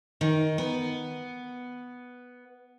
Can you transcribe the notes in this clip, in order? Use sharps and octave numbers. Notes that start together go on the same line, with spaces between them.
D#3
B3